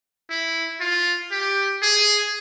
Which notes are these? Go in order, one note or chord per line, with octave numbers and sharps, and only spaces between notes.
E4
F4
G4
G#4